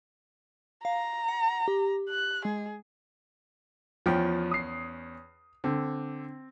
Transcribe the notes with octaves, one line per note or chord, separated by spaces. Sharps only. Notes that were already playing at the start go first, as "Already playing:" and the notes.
F5 A#5
F#5
G4
F#6
G#3 G#4
E2 F3 C#4 G5
D#6 C7
D3 C4